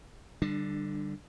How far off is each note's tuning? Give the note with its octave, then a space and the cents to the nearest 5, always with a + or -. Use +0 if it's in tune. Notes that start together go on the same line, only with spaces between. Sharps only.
D3 +0 G3 +0 D4 +25